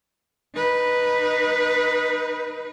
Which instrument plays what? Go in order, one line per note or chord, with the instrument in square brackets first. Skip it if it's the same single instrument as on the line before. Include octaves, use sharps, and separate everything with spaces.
[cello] D#4 B4